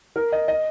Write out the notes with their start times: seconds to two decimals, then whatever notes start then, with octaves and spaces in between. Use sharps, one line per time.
0.16 A#4
0.32 D#5
0.48 D#5